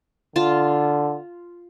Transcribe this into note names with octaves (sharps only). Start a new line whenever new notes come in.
D3 F4 A5